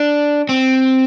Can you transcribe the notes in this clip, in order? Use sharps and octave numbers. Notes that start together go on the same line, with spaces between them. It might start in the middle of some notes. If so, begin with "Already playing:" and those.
Already playing: D4
C4